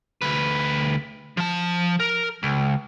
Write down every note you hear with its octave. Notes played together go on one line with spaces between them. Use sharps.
D2 B4
F3 A5
A#4
C#2